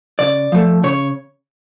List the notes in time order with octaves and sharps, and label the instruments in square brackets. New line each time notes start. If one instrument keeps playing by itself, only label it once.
[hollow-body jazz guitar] C#3 D5
F3 A3
C#3 C#5